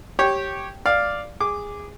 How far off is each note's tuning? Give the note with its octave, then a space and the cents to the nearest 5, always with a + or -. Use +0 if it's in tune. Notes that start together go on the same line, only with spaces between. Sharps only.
G4 -5 C#5 -15 G5 -5
D5 +0 F5 +0 D6 +0
G#4 -15 D6 +0